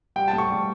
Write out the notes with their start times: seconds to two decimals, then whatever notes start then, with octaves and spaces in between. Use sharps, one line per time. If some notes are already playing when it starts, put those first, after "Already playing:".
0.16 G3 G5
0.28 A5
0.33 A2
0.38 C#6
0.50 G3